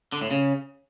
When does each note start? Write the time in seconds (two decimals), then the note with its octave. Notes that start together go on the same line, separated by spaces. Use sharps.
0.12 D3
0.22 A2
0.31 C#3